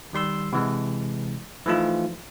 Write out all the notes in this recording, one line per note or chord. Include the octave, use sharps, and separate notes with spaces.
D#3 G3 C6 E6
C3 E3 G#3
E3 F3 A3 D#4 F4